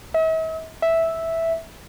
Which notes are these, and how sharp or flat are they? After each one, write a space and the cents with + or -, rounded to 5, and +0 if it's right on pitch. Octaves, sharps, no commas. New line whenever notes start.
E5 -45
E5 -5